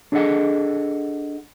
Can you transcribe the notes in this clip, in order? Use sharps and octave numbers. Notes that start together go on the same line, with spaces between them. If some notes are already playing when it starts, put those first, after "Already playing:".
D4 G#4 A4 D#5 F#5